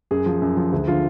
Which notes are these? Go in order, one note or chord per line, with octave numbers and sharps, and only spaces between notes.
F#2 G#4
F3
F#2
F3
D2 G#4
D3 F3 F4